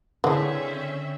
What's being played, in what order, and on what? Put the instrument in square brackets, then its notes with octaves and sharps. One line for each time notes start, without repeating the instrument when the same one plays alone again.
[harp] D3 [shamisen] E3 F3 [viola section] C4 C#4 E5 [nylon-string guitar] G#4